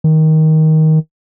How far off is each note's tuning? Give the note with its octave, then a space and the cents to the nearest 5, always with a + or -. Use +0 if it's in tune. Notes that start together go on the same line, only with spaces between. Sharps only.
D#3 +15